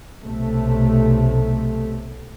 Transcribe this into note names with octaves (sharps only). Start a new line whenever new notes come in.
B1 C3 A3